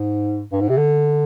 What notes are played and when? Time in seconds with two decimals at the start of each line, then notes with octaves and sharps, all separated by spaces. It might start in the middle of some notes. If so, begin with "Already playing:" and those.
Already playing: G#2
0.52 G2
0.61 G#2
0.69 C3
0.77 D3